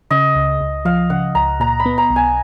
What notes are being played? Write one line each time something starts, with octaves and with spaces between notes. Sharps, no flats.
C#3 D#5
C#2
C#2
F3 F5
C#3 F#5
C#2 A#5
A#2 A#5
B5
B3
A#5
B1
G#5